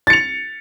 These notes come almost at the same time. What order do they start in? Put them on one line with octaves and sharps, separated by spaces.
A6 C#7 F7